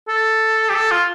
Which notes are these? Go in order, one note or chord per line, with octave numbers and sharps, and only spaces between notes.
A4
G4
A4
F4